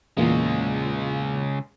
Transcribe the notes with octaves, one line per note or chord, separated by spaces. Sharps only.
E2 A#2 C#3 G#3 A#3